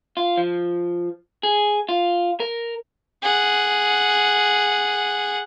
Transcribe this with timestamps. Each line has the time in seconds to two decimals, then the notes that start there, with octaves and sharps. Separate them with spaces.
0.17 F4
0.37 F3
1.43 G#4
1.89 F4
2.40 A#4
3.23 G#4 F#5